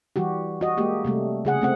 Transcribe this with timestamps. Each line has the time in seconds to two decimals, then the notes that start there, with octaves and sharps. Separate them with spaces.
0.16 E3 G3 F#4 G4
0.61 F#4 D#5
0.77 G#3 A#3 G4
1.05 C3 G3 A3
1.45 C#3 G#4 F#5
1.61 A3 C4 F#5